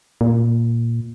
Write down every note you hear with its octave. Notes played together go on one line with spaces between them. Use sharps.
A#2